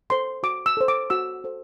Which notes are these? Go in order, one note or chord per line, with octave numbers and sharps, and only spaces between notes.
A4 C5 C6
F#4 D6
E6
A4 C5
D6
F#4 E6
A4 C5